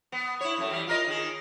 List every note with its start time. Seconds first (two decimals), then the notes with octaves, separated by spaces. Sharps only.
0.12 B3
0.41 E4 C#5
0.58 F#2 A3
0.69 E3 G3
0.87 F4 A#4 D#5
1.07 D#3 G#4